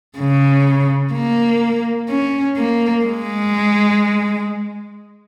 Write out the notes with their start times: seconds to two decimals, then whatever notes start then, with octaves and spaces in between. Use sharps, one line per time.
0.18 C#3
1.13 A#3
2.09 C#4
2.57 A#3
3.05 G#3